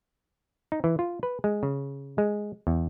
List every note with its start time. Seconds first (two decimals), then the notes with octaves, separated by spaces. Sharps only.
0.72 D#4
0.84 E3
0.99 F4
1.23 B4
1.44 G#3
1.63 C#3
2.18 G#3
2.67 E2